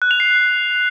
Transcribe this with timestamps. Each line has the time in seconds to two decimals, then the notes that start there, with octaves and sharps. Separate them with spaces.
0.02 F#6
0.11 F7
0.20 C7